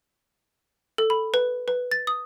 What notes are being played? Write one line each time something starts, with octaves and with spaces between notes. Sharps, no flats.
A4
B5
B4
B4
A6
D#6